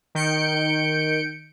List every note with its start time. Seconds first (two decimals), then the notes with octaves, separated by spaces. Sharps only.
0.15 D#3 G6 C#7 D7